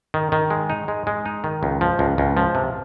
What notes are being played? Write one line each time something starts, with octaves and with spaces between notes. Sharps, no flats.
D#3
D#3
G#3
D#4
G#3
G#3
D#4
D#3
C#2
F3
C#2
C#2
F3
C3